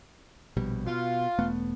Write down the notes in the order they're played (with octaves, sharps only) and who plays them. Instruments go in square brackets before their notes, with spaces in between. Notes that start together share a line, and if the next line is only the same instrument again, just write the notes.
[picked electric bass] A#1 B2 G3
[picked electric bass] B2 [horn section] F4
[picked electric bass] E1 A3 B3